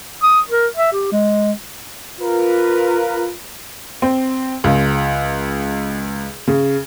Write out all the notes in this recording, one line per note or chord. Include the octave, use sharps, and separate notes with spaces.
D#6
A#4
E5
G4
G#3
F4 A#4 B4
C4
C#2
C#3